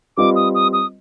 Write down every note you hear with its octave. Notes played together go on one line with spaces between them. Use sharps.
G3 C4 F4 B4 D#5 D6
D#6
D#6
D#6